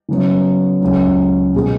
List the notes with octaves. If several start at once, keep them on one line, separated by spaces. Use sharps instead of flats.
C#3 F#3 B3
C#2 C#3 F#3
B2 G#3 B3